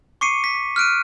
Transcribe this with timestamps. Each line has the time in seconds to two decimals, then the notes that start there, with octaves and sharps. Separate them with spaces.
0.21 C#6 D6 C7 C#7 D#7
0.44 B6
0.76 F6 F#6 D7 D#7